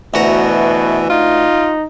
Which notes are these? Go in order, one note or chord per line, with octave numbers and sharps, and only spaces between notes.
D2 B2 E3 F#4 A#5
D#4 F4